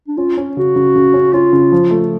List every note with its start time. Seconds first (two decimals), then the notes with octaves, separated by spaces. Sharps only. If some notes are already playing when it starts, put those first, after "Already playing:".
0.08 D4
0.17 C#4 F4
0.37 C#4
0.57 C#3 F#4
0.76 C#3
0.96 C#3
1.14 C#4
1.33 C#4 F4
1.53 C#3
1.72 F3
1.91 A3